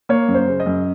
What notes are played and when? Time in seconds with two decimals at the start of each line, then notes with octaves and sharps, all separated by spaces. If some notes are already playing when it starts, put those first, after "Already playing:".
0.09 A#3 C#5
0.28 F#2
0.34 C5
0.47 C#3
0.60 D#5
0.66 F#2